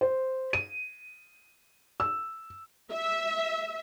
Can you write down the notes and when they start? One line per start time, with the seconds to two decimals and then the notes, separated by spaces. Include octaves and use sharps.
0.01 C5
0.53 D#7
2.00 E6
2.92 E5